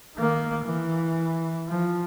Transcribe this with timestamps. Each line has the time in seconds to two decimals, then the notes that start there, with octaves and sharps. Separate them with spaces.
0.17 D#3 A#3
0.64 E3
1.68 F3